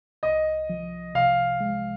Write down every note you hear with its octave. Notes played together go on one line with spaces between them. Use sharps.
C2 D#5
F3
C3 F5
G#3